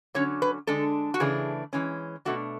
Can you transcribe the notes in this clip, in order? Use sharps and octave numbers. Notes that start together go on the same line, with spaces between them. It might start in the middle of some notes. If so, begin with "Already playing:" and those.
D3 F#3 C#4 C#5
B4
D3 G#3 D4 A4
F#4
C#3 E3 A3 D4 G#4
E3 G#3 C#4
B2 A3 D4 F#4